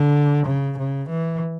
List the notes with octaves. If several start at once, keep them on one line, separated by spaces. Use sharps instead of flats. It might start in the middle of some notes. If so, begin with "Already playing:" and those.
Already playing: D3
C#3
C#3
E3